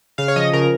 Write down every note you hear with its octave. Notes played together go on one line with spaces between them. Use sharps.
C#3 F5
C#5
F3 D#5
C#3 A#4